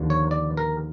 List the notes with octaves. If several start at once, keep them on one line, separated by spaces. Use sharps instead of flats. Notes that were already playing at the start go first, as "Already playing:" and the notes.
Already playing: D#2 D3 F3
C#5
D5
A#4